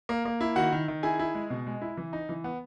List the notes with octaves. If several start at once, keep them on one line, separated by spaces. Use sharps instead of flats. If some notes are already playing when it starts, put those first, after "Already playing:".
A#3
A#3
E4
D#3 F#4 F#5
D#3
D#3
E4 G#4 G#5
E4
G#3
B2
G#3
E4
E3
D#4
E3
B3